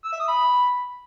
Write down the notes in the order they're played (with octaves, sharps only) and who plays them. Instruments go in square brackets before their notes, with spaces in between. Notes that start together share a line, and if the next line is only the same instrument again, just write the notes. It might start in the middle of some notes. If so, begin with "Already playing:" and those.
[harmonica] E6
E5
D#6
B5